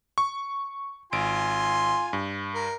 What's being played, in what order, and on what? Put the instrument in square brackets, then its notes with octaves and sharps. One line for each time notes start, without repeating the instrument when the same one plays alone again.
[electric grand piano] C#6
[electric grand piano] G#1 D7 [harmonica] F4 G#5 C6
[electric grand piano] G2
[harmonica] A#4